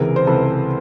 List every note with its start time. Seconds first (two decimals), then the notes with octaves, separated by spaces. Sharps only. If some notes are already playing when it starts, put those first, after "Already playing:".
Already playing: C#2 C3 E3 G#4 A#4
0.16 C5
0.27 C#2 C3 E3 A4 B4